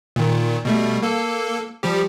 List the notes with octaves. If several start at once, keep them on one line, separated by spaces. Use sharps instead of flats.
A#2 D#3
B2 G3 A3
A#3 A4
F3 G3 G4